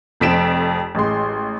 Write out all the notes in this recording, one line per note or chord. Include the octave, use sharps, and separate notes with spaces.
F1 F2 F3 B6 D7 E7
A1 G#3 C6